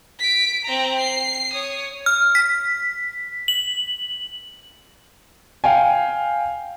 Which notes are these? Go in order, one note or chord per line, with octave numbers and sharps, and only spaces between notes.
B6 D7
C4 A#5
C7
C#5 D#6
F6
B6
F#7
F5 G5 G#5